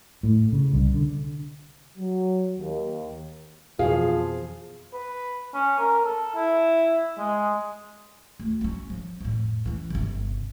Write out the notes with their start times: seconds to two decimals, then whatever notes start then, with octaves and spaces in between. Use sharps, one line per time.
0.23 A2
0.52 C#3
0.73 C2
0.94 D3
1.98 F#3
2.58 D#2
3.79 F2 B2 E3 F3 G#4 F5
4.94 B4
5.54 C#4
5.79 A#4
6.05 A4
6.35 E4
7.18 G#3
8.40 D2
8.61 F#3 C#4
8.90 F3
9.21 F2 A2
9.66 E3 C#4
9.90 G1 C3